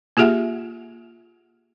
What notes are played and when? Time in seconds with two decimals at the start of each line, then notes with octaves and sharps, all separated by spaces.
0.17 A#3 F4 G4 G#4 E5 F#5